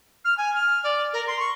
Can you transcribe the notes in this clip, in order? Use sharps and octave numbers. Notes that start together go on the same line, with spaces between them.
F6
G#5
F6
D5
A#4
C6
C#6